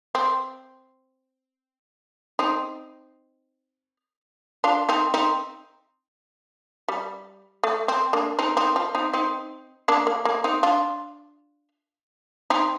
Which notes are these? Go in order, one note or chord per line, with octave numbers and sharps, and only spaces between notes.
C4
C4 D#4
D4 F4
C4 D#4
C4 D#4
G3
A3
C4
A#3 D4
C4 D#4
C4 D#4
F3
C4 D#4
C4 D#4
A#3 D4
A#3
A#3
C4 D#4
D4 F4
C4 D#4